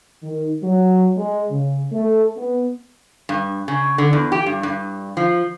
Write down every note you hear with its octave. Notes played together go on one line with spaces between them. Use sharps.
D#3
F#3
G#3
C#3
A3
B3
G2
C#3
D3
E2
G4
G2
G2
F3